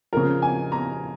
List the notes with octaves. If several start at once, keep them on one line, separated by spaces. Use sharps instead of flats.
C#3 F3 A#4
G#5
A#5